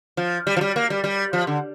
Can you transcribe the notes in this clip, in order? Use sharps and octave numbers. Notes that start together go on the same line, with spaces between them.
F3
G3
F3
G3
A#3
G3
G3
F3
D3